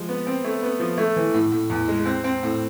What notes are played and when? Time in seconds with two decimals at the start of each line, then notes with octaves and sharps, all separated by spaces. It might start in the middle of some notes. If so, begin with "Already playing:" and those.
Already playing: F3 G#3
0.09 B3
0.27 C4
0.44 A3
0.63 B3
0.80 F3
0.98 A3
1.16 E3
1.34 A2
1.52 A2
1.70 E2
1.88 G#3
2.06 C4
2.24 C4
2.43 A2